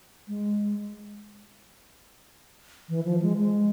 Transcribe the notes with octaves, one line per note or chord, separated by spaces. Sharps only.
G#3
E3
F3
G#3
G#3